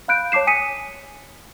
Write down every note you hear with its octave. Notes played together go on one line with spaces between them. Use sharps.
F5 B5 F#6 G6 D7
C#5 A5 D6 C7 E7
G#5 D#6 B6 C#7 D#7